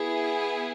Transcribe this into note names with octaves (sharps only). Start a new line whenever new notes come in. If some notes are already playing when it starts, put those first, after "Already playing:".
Already playing: B3 E4 G#4